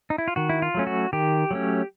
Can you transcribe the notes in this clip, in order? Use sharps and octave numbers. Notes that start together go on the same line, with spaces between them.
D#4
E4
F4
D#3 F#4
E4
F4
F#3 A3 C#4
F#4
D#3 G4
F#3 A3 C#4